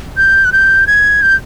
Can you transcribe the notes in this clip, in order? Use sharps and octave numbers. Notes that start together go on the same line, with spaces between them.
G6
F#6
G6
G#6
G6